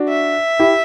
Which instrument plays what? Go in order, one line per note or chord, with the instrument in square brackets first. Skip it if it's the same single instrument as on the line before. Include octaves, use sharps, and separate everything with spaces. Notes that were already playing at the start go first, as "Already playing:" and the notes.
Already playing: [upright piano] D4 F#4
[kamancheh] E5
[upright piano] E4 G4